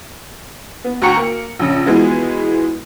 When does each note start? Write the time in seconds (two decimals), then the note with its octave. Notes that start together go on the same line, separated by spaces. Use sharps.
0.84 B3
1.02 D2 F#4 G5 A#5 C#6 C#7
1.17 A#3
1.59 A#1 C#3
1.86 B2 E3 F3 G#3 B3